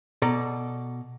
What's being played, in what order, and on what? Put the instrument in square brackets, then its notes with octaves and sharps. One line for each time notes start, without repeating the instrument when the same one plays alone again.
[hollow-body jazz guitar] B2 A4 D5 A#5